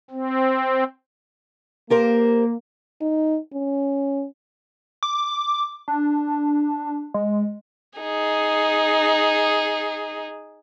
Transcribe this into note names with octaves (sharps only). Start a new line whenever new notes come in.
C4
A#3 G4 A#4 C5
D#4
C#4
D6
D4
G#3
D#4 G#4